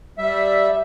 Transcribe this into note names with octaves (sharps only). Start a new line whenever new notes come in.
G3 E5